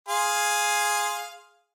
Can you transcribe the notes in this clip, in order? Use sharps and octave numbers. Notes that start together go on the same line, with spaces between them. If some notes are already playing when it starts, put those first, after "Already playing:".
G#4 F5 C6